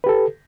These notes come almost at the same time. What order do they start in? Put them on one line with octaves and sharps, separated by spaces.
B4 G4 A4